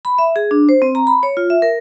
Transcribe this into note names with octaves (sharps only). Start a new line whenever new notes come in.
B5
E5
G#4
D4
C5
C4
A#5
B5
C#5
F4
E5
A#4